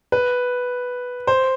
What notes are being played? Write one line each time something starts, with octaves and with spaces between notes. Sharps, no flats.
B4
C5